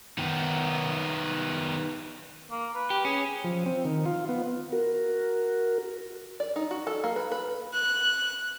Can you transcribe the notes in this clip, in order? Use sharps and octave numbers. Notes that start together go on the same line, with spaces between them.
D#3 B3
A#3
B4
G4
C#4 G#4
F3
C4
D#3
F4
B3
F#4 A#4
D5
D#4
F#4
A4
A#3
B4
B4
F#6